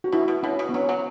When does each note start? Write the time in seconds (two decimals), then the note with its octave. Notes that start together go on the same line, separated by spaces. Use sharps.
0.04 F#4
0.12 B2 E4
0.28 B2
0.43 B2 C#4
0.59 B2
0.69 B3
0.74 F#3 C#4
0.89 F#3